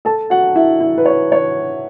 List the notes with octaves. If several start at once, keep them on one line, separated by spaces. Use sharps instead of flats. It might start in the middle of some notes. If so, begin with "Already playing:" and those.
A4 A5
F#4 F#5
E4 E5
E4 E5
B4
C#5
C#5